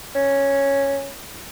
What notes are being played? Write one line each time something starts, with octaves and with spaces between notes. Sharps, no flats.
C#4